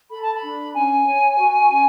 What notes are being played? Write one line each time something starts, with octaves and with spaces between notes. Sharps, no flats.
A4 B5
A5
B5
D4
C#4 G#5
C#5
F#4
C#4